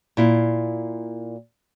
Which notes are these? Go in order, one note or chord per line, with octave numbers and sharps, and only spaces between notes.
A#2 E4 F4